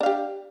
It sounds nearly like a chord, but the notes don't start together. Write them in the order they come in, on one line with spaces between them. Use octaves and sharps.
D4 F5 G4